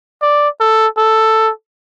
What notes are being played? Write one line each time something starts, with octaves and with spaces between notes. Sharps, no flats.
D5
A4
A4